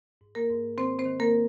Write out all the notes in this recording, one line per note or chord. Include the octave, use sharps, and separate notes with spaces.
G#2
A#3 A#4
G#2
D#3 C4 C5
C4 C5
D#3
A#3 A#4